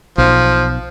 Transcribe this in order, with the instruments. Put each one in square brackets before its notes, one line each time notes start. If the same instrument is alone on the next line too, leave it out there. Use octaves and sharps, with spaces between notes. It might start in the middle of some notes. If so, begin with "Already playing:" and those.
[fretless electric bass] B1 [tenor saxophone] F3